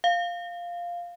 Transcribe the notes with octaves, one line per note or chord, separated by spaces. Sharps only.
F5